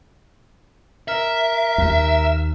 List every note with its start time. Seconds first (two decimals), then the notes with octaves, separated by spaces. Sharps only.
1.08 A#4 E5
1.78 D#2